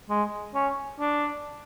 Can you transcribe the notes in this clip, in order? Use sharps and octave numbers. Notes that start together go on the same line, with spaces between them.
G#3
C#4
D4